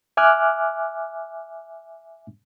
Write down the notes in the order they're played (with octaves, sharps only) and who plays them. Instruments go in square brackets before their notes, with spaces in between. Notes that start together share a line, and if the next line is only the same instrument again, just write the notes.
[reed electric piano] E5 G#5 D6 F6 F#6